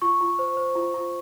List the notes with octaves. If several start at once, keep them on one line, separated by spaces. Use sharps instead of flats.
F4 C#6
F4
C5
C5
F4
F4